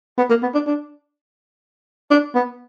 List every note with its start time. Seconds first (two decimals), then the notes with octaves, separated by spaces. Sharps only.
0.18 B3
0.30 A#3
0.43 B3
0.54 D4
0.67 D4
2.11 D4
2.35 B3